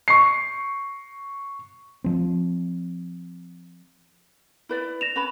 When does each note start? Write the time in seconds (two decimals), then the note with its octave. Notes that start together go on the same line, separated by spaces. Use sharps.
0.08 C#6 C7
2.04 F3 C4
4.69 E4 B4 D5
5.01 A#6 E7 F7
5.16 C#4 B4 B5